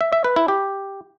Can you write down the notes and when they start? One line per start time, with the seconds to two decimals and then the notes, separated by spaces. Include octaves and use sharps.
0.01 E5
0.13 E5
0.24 B4
0.36 E4
0.48 G4